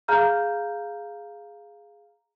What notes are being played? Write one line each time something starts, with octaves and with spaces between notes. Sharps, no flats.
G#4 F5 A#5 F6 G6